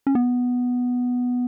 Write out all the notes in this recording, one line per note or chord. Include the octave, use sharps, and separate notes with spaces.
C#4
B3